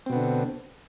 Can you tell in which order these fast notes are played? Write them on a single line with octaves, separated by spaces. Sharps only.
C4 B2 B3 D3